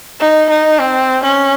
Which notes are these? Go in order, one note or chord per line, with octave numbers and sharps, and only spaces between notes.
D#4
D#4
C4
C#4